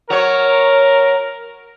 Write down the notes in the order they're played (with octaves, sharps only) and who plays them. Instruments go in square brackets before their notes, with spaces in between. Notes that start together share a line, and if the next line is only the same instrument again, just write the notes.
[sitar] F#3 C#5 [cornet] A#4